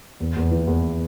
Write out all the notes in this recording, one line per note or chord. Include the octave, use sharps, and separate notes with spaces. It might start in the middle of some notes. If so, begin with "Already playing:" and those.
E2
E2
E3
E2